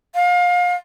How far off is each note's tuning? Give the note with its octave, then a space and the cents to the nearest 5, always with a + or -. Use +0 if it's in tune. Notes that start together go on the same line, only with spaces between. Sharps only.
F5 +30